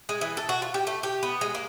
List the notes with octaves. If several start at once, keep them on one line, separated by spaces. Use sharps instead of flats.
G#3
E3
A4
F#4
F4
G4
A3
G4
B3
G#3
A#3